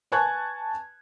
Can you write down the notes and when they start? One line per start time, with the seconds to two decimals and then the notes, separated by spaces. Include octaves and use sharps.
0.12 B4 G#5 A5 C#6 F#6 G#6